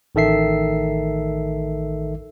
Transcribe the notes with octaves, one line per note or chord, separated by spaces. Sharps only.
A1 D#3 A4 E5 C7